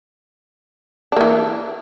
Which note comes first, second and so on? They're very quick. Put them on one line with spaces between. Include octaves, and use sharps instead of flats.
D4 A#3 E3